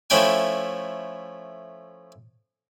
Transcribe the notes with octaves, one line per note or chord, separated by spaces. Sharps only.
F3 A3 C#4 E4 G5 G#5